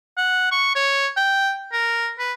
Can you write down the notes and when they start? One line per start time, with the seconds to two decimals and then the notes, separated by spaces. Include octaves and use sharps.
0.18 F#5
0.51 C#6
0.76 C#5
1.17 G5
1.72 A#4
2.19 B4